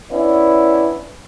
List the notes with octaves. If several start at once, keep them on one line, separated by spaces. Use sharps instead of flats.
B3 C#4 D4 E4